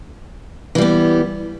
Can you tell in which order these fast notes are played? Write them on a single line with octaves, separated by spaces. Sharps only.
E3 G3 B3